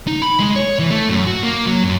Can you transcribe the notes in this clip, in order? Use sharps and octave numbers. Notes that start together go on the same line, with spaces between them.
D#4
B5
G#3
C#5
E3
A3
F#2
F#4
A#3
F#3
F#2